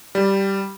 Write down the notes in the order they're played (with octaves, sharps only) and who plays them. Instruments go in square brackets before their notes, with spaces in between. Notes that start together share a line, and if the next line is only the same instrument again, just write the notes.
[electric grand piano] G3